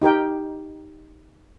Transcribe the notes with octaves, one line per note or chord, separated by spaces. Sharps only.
D#4 G4 A#4 G5